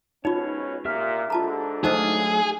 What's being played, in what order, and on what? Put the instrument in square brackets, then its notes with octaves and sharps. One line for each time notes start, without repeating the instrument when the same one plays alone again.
[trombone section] G#2 B2 C#4 [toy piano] D#4 F4 [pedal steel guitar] C#5
[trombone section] A#2 [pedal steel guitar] G4 E5 F6
[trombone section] G#2 D3 [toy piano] F4 A5 A#5
[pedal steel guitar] F#3 A3 F5 [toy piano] D#4 C5 D#5 [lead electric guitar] G#4